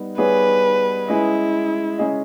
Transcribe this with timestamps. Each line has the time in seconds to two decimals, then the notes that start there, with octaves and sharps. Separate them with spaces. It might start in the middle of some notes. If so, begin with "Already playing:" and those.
Already playing: G3 B3 D#4
0.18 G3 B3 D#4 G#4 B4 C#5
1.08 G#3 C#4 E4 G#4 D#5
1.98 G#3 C#4 G#4 D#5